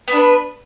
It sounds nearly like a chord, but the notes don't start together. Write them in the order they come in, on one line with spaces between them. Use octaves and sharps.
B3 D4 B4